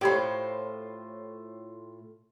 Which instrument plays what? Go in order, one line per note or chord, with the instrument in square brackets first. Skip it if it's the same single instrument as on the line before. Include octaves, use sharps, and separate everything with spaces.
[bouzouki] A2 F4 C5 [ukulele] G4 C#5 B5